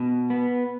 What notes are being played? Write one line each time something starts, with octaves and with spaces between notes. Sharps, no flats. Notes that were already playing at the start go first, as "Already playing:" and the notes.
Already playing: B2
B3